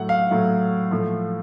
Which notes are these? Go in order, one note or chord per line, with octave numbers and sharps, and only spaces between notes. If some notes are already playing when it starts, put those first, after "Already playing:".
Already playing: A2 F#3 A3 F#5
F5
A2 F#3 A3
A2 F3 A3